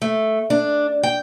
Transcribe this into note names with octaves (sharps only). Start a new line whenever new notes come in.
A3
D4
G5